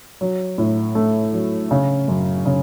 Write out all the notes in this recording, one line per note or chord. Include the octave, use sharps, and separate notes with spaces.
F#3
A2
A3
F#3
C#3
F#2
C#3